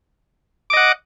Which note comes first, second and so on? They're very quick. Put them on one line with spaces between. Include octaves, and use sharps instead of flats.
D6 D#5 F#5